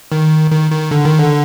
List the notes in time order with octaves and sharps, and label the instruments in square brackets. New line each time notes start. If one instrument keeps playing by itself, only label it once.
[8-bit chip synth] D#3
D#3
D#3
D3
D#3
D3